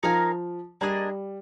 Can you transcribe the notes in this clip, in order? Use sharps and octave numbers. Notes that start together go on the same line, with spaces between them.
F3 D#4 A#4 F5 G#5
G3 A#3 D4 G#4 D#5